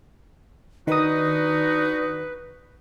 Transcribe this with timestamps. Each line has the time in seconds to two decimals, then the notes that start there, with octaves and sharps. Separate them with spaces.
0.87 D#3 D4 D#4 F#4 B4 D#6